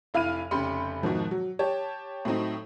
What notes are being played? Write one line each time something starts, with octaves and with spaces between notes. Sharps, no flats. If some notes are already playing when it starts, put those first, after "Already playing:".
F1 E4 F5 B5 F6 D#7
F1 C#3 G4 B5 C6 C#7
G#2 B2 D#3 F3
F#3
G4 C#5 A5
A2 F#3 C4 D#4